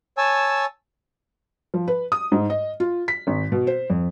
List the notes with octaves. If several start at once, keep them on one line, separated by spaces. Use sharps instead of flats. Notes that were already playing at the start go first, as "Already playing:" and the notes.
C#5 G#5 A5 E6
F3
B4
D#6
G#2
D#5
F4
B6
G#1
B2
C5
F2